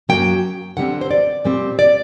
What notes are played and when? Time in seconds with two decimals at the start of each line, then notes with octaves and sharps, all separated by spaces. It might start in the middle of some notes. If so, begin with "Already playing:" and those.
0.09 F#2 F#3 A#3 G5
0.77 D3 G3 C4 F#5
1.01 C5
1.11 D5
1.45 A#2 G3 C4
1.79 D5